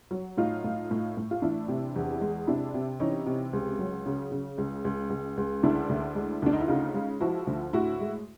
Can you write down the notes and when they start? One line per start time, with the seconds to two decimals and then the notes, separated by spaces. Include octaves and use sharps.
0.11 F#3
0.37 A2 D#4 F4
0.64 A2
0.91 A2
1.17 A2
1.31 F4
1.42 E3 D4 E4
1.68 C3
1.96 E2
2.21 G#3
2.47 C3 D4 E4
2.74 C3
3.00 E3 C#4 D#4
3.26 C3
3.53 C#2
3.79 F#3
4.06 C#3
4.32 C#3
4.58 C#2
4.85 C#2
5.10 C#2
5.37 C#2
5.63 D2 D4 E4
5.89 D2
6.15 G#3
6.42 D2 D4
6.53 D#4
6.60 E4
6.68 C#3 D#4 F4
6.94 G#3
7.20 F3 E4 F#4
7.47 D2
7.73 A2 E4 F#4
8.00 G#3